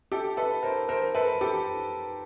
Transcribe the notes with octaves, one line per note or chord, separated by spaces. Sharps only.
G4 A4
A4 B4
A#4 C5
A#4 C5
A4 B4
G4 A4